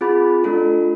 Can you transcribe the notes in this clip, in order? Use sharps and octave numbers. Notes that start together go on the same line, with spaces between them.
C4 F4 G#4 B5
A3 D4 F4 A4